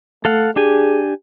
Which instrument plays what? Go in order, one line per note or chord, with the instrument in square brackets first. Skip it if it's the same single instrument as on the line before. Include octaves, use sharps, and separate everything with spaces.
[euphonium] A3 [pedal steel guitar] A4 F5 F#5
[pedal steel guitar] D4 G4 G#5 [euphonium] G#4